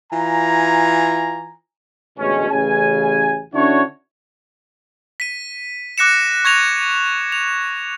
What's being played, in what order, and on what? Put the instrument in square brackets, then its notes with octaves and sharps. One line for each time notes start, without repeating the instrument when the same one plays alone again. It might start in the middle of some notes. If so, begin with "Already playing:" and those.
[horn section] E3 F4 G#5 A#5
[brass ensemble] A1 D2 B2 G#3 C#4
A1 C#3 G#5
D3 C#4 D4 E4 F#4 C#5
[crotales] B6 D#7
D6 F#6 A#6 C#7 E7
C#6 G#6 A#6 F7
F7